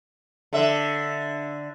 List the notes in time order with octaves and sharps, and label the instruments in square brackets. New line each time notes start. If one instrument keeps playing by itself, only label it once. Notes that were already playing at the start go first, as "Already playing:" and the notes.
[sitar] D3 E5